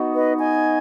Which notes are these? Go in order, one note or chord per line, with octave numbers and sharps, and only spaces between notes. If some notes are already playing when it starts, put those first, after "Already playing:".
Already playing: B3 D#4 F#4
B4 D#5
D#5 G#5